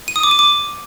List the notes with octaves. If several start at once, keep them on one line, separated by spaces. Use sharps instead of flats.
D#7
D#6
D6
D#7
D6